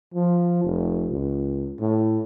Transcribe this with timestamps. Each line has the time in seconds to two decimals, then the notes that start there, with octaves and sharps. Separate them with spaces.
0.14 F3
0.64 F1
1.11 C#2
1.80 A2